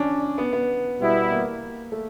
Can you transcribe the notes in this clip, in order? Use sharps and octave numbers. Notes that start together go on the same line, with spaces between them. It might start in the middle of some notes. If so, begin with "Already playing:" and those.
Already playing: C#4 D4
B3
B3
B2 G3 B3 E4
A#3
A3